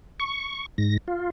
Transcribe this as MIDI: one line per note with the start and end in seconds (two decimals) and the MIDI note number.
0.20 0.66 85
0.78 0.97 44
0.78 0.97 94
1.08 1.30 65